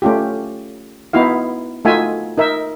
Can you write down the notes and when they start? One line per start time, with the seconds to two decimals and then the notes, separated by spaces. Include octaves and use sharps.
0.02 A3 C#4 F4 G4
1.13 B3 D#4 E4 F#4 F5
1.85 A3 D#4 F4 F#4 E5 G#5
2.38 D#4 A#4 E5